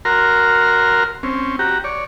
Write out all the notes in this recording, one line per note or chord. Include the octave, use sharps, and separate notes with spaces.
F#4 A#4 A#5 C6 F6
C4 C#4
F#4 G4 A#5
C#5 D5